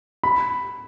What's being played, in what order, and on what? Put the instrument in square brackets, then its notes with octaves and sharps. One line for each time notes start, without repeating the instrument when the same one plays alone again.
[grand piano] B5